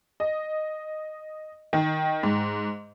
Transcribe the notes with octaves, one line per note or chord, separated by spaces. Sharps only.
D#5
D#3
G#2